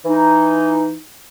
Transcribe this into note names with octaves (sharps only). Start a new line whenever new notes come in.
E3 D#4